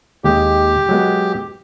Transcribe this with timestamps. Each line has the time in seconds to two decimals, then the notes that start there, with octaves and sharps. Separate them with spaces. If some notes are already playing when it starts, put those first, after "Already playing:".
0.24 D#2 G#3 G4 D#5
0.89 F#3 G#3 B3